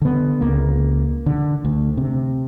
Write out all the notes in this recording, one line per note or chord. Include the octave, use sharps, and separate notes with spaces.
D3 B3
C#2 A#3
D3
D2
C3